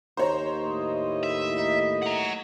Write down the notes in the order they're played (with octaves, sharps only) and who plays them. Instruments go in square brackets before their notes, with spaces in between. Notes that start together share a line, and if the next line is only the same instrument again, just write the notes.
[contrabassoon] D#2 [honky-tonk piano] C5 C#5 A#5
[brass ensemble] A2 E4 D#5
[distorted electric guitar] E5
[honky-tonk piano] D#4
[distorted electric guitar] F#5 A#5